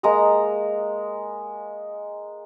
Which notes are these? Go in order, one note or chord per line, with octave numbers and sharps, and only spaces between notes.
G#3 A#3 A#5 D#6